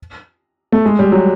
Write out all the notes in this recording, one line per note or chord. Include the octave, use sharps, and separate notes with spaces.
A3
G#3
G3
F#3